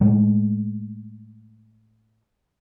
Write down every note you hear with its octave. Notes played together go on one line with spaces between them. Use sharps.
A2 G#3 A3